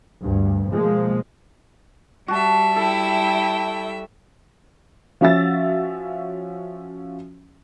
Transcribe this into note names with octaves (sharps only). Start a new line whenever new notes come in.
D2 G2
B2 F3 G#3 A#3
G3 F#4 E5 A5
E4 A4 G5
F3 C#4 F#4 E5 E6 A6